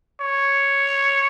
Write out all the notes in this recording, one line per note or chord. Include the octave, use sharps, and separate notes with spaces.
C#5